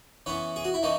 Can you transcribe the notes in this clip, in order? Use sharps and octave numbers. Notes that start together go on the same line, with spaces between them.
E3 B3 C#4
G#4
F#4
E4
E3 A#3 C#4 D#4